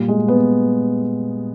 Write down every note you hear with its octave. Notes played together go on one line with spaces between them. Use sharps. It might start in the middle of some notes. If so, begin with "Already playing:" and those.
Already playing: A#2 G3
G#3
B3